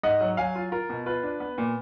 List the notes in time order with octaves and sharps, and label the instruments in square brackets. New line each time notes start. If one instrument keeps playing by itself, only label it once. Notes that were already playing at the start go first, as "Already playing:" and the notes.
[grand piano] G#2 D#5 F#5
F#3
F#3 F5 G#5
F4
F4 A#4
B2
F4 B4
D4
B3
A#2